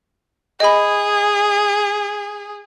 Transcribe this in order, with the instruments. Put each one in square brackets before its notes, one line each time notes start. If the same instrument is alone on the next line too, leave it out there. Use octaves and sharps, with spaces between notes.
[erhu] G#4 [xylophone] D#5 B5